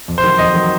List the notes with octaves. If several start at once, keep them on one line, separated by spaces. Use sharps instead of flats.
F2
C5
D#3 F#3
F2 D#5
D#3 F#3